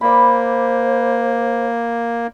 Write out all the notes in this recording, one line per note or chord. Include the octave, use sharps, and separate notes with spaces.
A#3 C5 D5 B5